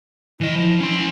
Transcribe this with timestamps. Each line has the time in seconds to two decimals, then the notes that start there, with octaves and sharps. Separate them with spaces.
0.41 E3 E4 D#5
0.55 F3
0.80 C#4 C6